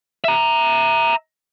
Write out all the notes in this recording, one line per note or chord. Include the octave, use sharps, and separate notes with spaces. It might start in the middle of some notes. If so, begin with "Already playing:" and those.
E5 A#5